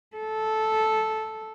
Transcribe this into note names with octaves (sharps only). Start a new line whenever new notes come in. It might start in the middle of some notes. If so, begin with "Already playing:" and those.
A4